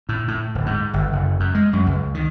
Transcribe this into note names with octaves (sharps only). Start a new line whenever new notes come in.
A2
A2
D1
G#2
G1
F#1
F#2
G#3
F#2
C#2
D#3